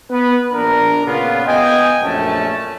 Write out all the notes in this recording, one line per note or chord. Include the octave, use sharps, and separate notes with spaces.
B3 B4
A#1 D4 A#4
A#2 C#3 B3 F4
B3 D#5 G5 G#5
A#1 F#2 A3 C#4 A5